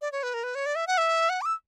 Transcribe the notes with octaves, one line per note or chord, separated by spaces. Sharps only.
D5
C#5
B4
A#4
B4
C#5
D5
E5
F#5
E5
F#5
D6
E6